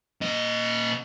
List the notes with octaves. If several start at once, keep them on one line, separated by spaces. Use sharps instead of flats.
A#2 D#5